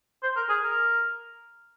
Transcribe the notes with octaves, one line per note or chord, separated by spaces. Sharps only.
C5
A#4
G#4
A#4